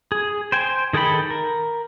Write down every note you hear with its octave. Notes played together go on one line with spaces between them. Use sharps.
G#4
C5 G5 G#5
D#3 G#4 A4 G5 B5
A#4